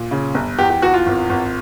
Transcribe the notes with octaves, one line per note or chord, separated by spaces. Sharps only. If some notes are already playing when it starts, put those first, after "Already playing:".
Already playing: A#2
C#3
G1
E2 G4
G4
E2 F#4
F4
G#1
G#1